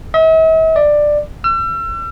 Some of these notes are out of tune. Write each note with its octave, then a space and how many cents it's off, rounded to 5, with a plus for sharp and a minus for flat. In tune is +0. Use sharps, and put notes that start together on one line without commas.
E5 -45
D5 +10
E6 +40